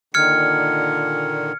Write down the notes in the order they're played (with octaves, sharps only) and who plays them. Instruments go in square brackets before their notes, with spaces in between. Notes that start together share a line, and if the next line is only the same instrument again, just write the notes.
[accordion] A#2 D3 D#3 [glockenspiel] F6 G#6 C#7